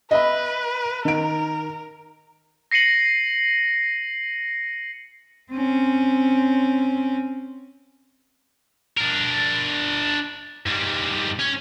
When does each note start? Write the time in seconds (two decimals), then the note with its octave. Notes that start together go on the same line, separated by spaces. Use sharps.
0.11 B4 D#5 E5 B5
1.05 D#3 A#4 D7
2.71 A#6 C7 C#7 D#7 F#7
5.52 C4 C#4
8.97 D4 A#4
10.66 G#2 G3
11.39 C#4